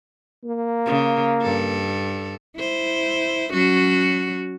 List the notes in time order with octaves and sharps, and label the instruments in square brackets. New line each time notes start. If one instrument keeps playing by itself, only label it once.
[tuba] A#3
[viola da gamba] C#3
G2 A4
E4 C5
F#3 C#4 F#4